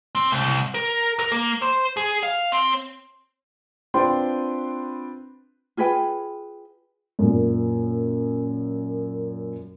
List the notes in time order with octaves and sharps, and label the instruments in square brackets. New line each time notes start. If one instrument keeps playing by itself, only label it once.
[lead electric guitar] C4
C2
A#4
A#4
A#3
C5
G#4
F5
C4
[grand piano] C4 D4 F4 B4 G5 C6
[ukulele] F4 G#4 B4 G5
[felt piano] F#2 A#2